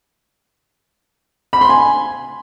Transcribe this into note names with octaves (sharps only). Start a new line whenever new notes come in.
B5
C6
G#5